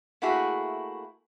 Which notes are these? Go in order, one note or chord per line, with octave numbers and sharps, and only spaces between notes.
A3 A#3 E4 F#4 G#4